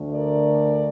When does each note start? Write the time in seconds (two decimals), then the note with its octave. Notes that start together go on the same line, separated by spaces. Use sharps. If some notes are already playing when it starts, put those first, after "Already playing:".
Already playing: D2 D3 A3
0.11 A#4 D5